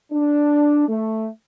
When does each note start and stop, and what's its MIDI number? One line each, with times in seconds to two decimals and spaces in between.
0.12 0.87 62
0.88 1.27 57